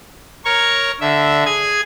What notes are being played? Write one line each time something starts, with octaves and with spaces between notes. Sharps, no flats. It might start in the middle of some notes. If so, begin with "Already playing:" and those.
A#4 C#5 C#6
D3 E5
G#4 G#5 G#6